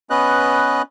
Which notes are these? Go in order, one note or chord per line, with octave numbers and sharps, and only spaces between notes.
B3 C#4 B4 D#5 F#6